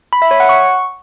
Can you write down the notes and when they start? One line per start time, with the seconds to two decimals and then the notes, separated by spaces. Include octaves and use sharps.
0.13 B5
0.22 E5
0.31 C#5
0.40 F#5
0.49 C#6